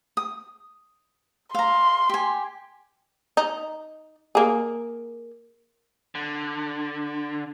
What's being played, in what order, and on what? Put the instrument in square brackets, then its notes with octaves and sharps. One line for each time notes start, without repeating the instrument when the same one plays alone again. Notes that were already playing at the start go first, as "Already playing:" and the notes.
[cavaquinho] D#6
[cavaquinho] F5 A#5 [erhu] C6
[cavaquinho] G4 G#5
[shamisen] D#4
A#3 G#4
[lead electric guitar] D3